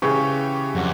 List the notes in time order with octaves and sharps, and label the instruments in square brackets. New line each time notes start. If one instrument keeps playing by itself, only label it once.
[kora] C#3 C5 [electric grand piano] E3 C#4 G4 [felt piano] C#6
[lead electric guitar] F2 [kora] D3 F#3 D4